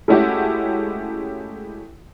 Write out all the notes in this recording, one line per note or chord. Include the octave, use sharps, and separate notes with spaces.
G#3 A3 C#4 E4 F#4 G4